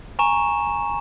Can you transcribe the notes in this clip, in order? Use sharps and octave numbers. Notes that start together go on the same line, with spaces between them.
G#5 A#5 C#6 E7